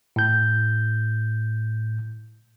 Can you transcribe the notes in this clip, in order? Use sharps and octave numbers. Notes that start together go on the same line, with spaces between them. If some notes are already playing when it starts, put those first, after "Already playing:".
A2 G6